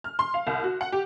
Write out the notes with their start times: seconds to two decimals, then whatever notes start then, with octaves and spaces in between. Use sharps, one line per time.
0.04 F6
0.19 C6
0.34 F5
0.47 C2
0.64 F#4
0.81 F#5
0.92 G4